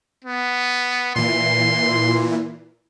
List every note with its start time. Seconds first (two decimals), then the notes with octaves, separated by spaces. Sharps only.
0.24 B3
1.16 A#2 E3 C6